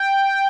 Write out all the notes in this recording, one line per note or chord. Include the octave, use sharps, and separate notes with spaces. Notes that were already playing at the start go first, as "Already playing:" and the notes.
Already playing: G5